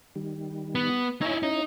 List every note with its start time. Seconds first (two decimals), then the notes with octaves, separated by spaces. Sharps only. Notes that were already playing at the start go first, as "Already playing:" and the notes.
0.16 D#3 G3
0.75 B3
1.21 D#4 E4 C#5 E5 G#5
1.43 C#4 D#4 E4